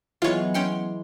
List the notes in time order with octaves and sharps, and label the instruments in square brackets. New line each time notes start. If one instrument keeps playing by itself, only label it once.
[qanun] E3 G#3 [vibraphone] F#3 B3 [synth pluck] F4 C#5
[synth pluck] C#4 G5 C#7 [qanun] C6